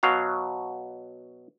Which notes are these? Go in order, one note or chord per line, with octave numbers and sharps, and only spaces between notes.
B2 F#3 F5